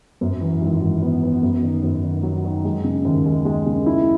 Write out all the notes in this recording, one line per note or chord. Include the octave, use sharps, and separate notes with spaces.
F#2
E3
G#1
G#1
B3
B3
F#2
D#3
F#2
D#3
F#3
D#3
G#3
C#3
D#2
G#3
G#3
C#3
E4